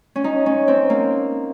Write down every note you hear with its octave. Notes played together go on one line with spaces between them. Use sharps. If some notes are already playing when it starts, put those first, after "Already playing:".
C#4
D#4
C#4
C4
A#3